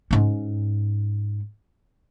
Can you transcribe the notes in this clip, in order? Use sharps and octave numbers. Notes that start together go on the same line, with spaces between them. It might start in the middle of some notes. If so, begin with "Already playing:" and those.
G#2 C#4